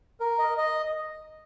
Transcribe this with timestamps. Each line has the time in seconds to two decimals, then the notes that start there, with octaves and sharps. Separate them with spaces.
0.20 A#4
0.38 D#5
0.58 D#5